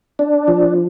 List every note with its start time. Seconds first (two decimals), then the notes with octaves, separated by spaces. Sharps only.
0.19 D4
0.48 F3